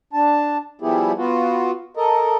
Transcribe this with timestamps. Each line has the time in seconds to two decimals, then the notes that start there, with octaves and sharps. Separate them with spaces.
0.13 D4 A5
0.81 F3 G3 B3 E4 G4 G#4
1.17 B3 F4 F#4
1.97 A4 A#4 D#5